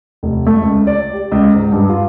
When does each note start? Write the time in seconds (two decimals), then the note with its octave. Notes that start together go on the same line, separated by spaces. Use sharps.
0.23 F1
0.47 A3
0.62 C#2
0.87 D5
1.13 G4
1.32 C#2
1.54 G#2
1.72 G2
1.89 F4